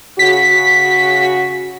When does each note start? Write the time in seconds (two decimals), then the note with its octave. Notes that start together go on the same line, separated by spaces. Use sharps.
0.19 C#3 F#4 B6